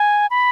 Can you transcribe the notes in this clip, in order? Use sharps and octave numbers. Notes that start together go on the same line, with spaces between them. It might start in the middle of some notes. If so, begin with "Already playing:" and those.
Already playing: G#5
B5